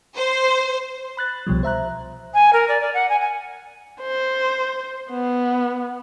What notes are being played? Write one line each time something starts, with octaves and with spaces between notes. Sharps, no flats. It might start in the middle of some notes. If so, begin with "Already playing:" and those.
C5
B5 F#6 A6
C2 B2 F3 G3
C5 E5 A#5 F#6
G#5
A#4
D5
D5
F#5
G#5
G#5
C5
B3